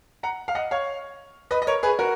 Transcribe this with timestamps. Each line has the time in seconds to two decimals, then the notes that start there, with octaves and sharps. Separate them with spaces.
0.23 F#5 A#5
0.48 F5
0.55 D#5 F#5
0.71 C#5 F5
1.51 B4 D#5
1.62 D#5
1.67 A#4 C#5
1.83 G#4 B4
1.99 F#4 A#4